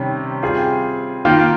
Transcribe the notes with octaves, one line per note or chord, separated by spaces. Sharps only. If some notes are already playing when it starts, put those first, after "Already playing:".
Already playing: C3 D#3 G3 C#4
G3 C4 F4 G#4
D#3 A#3 F4